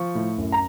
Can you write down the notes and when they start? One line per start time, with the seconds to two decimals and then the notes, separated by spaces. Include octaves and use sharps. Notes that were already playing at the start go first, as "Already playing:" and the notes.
Already playing: F3 C#6
0.15 A2
0.38 F#2
0.52 A#5